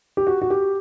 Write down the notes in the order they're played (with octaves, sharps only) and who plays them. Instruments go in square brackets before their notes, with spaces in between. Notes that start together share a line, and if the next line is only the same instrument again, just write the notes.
[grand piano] G4
F#4
F#4
G4